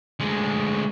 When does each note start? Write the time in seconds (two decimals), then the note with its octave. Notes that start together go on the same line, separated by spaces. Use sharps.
0.20 D2 G#3